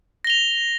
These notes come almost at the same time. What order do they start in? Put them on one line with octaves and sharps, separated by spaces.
A#6 G7 F7